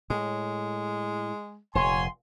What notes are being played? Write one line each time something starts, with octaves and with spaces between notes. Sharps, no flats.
A2 G#3
F1 A#2 C#5 G#5 C6